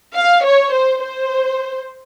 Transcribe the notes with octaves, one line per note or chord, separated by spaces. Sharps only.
F5
C#5
C5
C5